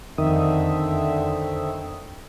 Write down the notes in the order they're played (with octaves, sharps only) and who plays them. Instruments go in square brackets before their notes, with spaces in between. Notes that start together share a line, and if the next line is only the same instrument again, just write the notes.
[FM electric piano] F2 D#6 [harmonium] D3 C4 E5 [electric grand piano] D#3